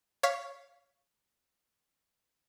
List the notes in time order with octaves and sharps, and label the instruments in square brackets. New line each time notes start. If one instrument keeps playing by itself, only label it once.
[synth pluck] C#5 F5 C#6 B6